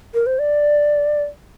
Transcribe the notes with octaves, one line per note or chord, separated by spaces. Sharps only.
A#4
C5
D5